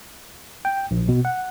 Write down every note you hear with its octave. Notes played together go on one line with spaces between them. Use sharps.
G5
A#1
B2
F#5